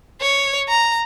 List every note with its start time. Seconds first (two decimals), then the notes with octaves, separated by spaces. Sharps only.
0.21 C#5
0.69 A#5